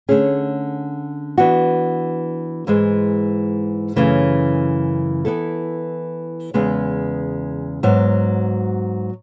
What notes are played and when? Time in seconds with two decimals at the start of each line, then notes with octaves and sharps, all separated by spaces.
0.09 D3 A3 C#4 G#4
1.38 E3 B3 D4 F#4
2.67 G#2 E3 G#3
3.96 F#2 C#3 E3 A3
5.25 E3 B3 E4 A4
6.54 E2 C#3 G#3 B3
7.83 G#2 F#3 B3 F#4